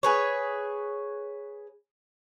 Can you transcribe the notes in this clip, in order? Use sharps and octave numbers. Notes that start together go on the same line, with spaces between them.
G#4 B4 C#5